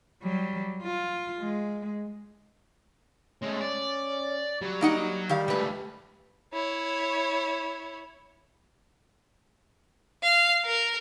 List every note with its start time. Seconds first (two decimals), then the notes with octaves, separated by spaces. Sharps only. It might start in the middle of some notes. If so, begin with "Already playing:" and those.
0.23 F#3 G3
0.83 F4
1.39 G#3
3.42 G#3 A3 C#4
3.60 D5
4.61 F#3 G3
4.81 A#3 D#4 F#5
5.29 D#3 G3 F5
5.48 C#2 G2 A3 B4
6.53 E4 C#5
10.23 F5
10.65 A#4